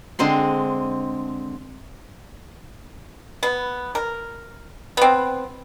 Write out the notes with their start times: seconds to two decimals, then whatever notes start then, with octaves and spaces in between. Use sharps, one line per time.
0.19 D3 G#3 C4 C5 A#5 C6
3.43 B3
3.95 A#4
4.97 B3 C4